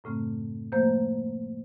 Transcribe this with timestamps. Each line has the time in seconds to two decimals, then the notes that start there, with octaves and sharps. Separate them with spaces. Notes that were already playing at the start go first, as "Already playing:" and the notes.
0.04 F#2 A2 C#3 A3 C4
0.72 F3 A3 A#3 C5 A#5 G6